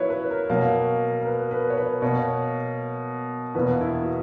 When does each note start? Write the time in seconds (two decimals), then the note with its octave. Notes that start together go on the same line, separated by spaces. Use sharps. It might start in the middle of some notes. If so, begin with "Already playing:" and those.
Already playing: F#3 A#3 C#4 E4 B4 C#5
0.10 B4
0.30 A#4
0.50 B2 F#3 A#3
1.21 A#4
1.25 B4
1.51 B4
1.70 C#5
1.77 B4
2.02 B2 A#3 C#5
3.55 E2 B2 A#3 B4
3.81 E4
4.05 F#4